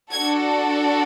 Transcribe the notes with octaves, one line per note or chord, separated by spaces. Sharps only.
D4 F#4 A4 G#6